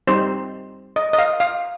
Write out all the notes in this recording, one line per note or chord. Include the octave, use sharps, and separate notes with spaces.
G3 C4 D#4 G4 C5
D#5
D#5
F5
F5